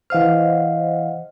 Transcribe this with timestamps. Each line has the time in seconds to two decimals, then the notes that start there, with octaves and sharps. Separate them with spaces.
0.10 E3 C5 D#5 F5 F#5 F6